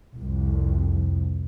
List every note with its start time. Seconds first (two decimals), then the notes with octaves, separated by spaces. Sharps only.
0.16 C2 F2